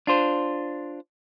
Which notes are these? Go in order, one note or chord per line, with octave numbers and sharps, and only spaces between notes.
D4 F4 C5